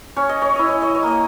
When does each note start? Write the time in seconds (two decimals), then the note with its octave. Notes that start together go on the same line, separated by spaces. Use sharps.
0.16 C#4 C#5
0.29 D#5
0.42 C#5
0.56 E4 D#5
0.68 C#5
0.82 D#5
0.95 C#5
1.03 A#3 D#5